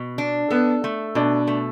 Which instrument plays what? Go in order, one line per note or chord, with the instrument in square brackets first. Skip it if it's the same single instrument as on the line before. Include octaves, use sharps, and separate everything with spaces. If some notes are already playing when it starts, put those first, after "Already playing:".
Already playing: [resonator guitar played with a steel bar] B2
D4
[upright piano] B3 [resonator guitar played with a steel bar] A4
[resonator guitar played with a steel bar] A3
[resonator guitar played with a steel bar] B2 [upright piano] D4
[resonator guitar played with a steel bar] A3